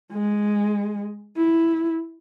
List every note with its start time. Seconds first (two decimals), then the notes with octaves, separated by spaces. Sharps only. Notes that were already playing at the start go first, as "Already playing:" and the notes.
0.12 G#3
1.37 E4